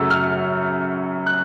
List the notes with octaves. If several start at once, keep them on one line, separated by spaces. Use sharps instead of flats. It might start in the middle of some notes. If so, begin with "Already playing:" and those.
Already playing: F#2 C#3 F#3 A3 E6
F6
F#6